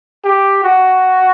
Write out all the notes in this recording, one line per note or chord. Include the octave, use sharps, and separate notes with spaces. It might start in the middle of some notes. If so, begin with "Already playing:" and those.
G4
F#4